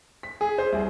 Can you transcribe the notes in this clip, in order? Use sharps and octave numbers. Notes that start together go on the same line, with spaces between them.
B6
G#4
C5
C2